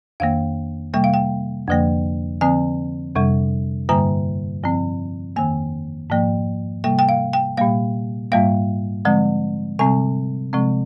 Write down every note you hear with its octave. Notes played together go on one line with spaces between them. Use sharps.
F2 D#3 A#3 F5
C3 G3 A#3 G5
F5
G5
F2 D3 F3 A#3
D3 F3 C4 G#5
F2 C3 G3
G2 D3 G3 A#3 A#5
G2 F3 C4
F2 D#3 A#3 G#5
G#2 F3 A#3
C3 G3 A#3 G5
G5
F5
G5
A#2 G3 A#3 F5
G#2 G3 A#3 F5
D3 F3 G#3 C4
C3 G3 C4 G#5
C3 F3 G#3 C4